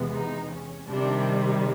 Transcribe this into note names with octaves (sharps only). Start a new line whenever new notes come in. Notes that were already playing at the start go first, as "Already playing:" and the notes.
Already playing: E2 C3 E3 G#3 B3
D#4
C#4
C3 D#3 G3 D4